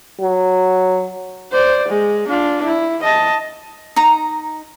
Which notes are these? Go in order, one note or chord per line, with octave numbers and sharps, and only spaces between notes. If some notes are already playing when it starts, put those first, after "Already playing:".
F#3
C5 D5
G#3
D4 F4
E4
D#5 A5
D#4 A#5